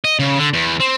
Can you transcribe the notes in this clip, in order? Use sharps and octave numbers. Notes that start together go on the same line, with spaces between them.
D#5
C#3
D3
E2
C4